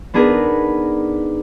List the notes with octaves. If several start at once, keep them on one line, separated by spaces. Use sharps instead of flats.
B3 D4 D#4 G#4 A#4 B4